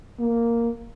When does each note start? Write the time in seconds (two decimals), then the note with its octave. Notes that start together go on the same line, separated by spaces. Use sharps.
0.19 A#3